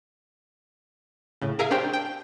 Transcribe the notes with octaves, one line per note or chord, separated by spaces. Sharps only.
A2 C#3
G#4 A#4 E5 F5
C#4 D4 G4 C5 G5
G5